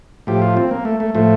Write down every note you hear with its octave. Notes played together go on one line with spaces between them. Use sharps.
A2 F3 G4
F4
C4
A#3
A3
A3
A2 F3 A3